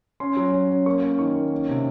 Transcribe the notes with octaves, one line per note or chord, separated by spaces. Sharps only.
C#4 C6
F#3
C#4
C#4
A#3 C#6
C#4
D#3 C#6
A#3
C#4
C3